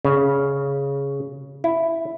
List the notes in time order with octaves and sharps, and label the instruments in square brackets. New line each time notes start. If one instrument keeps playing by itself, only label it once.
[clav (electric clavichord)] C#3
E4